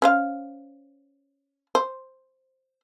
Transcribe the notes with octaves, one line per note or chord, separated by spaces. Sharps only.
C#4 C5 F5
C5